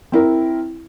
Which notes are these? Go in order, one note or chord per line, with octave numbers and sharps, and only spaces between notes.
C4 E4 A#4